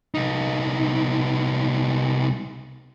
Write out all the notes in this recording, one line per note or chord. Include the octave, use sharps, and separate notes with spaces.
C2 D#4